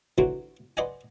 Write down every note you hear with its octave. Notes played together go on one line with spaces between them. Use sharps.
D3 E3 F#3 C4 F#4
B4 C5 D5 D#5 F#5 G#5